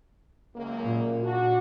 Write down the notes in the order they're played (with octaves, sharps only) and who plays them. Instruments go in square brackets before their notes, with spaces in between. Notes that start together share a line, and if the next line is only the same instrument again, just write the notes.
[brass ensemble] C#2 F#2 A#3
[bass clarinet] A#2
[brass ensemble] D4 F#4